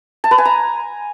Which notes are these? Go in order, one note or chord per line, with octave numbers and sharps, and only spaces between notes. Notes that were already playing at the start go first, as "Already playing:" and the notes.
A5
B4
G#5
A#5